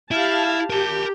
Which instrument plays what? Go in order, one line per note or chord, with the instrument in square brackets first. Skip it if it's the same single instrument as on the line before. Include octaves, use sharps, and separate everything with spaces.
[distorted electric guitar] E4 [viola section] G4 F5 A5
[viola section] G4 [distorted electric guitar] A#4 A5